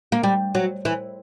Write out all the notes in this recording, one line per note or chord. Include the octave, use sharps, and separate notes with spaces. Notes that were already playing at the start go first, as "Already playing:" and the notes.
A#3
G3
F#3
E3